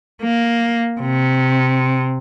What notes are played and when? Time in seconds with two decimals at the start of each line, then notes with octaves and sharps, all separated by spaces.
0.23 A#3
1.01 C3